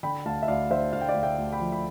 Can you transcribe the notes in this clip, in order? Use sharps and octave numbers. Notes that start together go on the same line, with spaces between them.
D3 G5 B5
D2 F5 A5
E5
D2 D5 F5
D3 C5 E5
D2 F5
G5
D5 F5
D2
E5 G5
D2
G5 B5
F3
B5